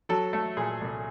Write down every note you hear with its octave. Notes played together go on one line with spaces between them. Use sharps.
F#3 A4
A3 A4
A#2 G#4
C2